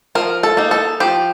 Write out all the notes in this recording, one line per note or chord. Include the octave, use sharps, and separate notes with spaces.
F3 A#4
A4
A#3 D#4
A4
F3 G4